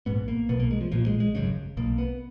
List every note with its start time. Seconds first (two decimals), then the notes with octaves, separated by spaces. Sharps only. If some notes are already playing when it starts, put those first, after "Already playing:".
0.06 A#1 G#2 B3
0.28 A#3
0.49 B1 B2 B3
0.60 A#3
0.71 G#3
0.81 F3
0.92 A#1 A#2 F3
1.06 G#3
1.20 G#3
1.35 G#1 F#2 C#3
1.77 B1 B2 A#3
1.98 B3